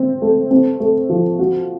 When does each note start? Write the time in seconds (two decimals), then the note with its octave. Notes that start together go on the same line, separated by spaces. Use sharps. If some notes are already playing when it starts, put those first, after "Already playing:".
Already playing: C4
0.22 A3
0.51 C4
0.80 A3
1.10 F3
1.39 F#4